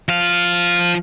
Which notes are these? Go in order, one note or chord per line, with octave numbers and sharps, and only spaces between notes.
F3 F5